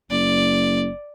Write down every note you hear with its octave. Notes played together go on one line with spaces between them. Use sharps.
F#1 D5